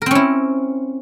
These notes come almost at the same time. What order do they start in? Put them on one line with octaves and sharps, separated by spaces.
A#4 C4 C#4 E4